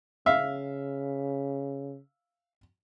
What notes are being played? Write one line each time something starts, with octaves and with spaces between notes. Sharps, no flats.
C#3 E5 F5